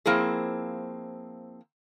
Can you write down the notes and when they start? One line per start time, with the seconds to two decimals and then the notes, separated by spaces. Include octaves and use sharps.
0.06 F3 A#3 C4 E4 G#4